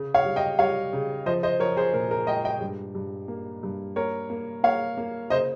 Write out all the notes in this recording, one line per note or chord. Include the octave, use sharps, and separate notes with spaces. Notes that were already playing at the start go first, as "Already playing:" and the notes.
Already playing: C#3
C#5 F5
G3
D#5 G5
G3 C#5 F5
C#3
F3 C5 D#5
C5 D#5
F3 A#4 C#5
G#4 C5
A#2 A#4
A#4
G#3 D#5 G5
D#5 G5
G2
G2
A#3
G2
A#3 A#4 C#5
A#3
A#3 C#5 F5
A#3
C#3 C5 D#5